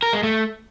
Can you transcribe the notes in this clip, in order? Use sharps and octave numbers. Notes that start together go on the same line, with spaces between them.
A#4
G#3
A3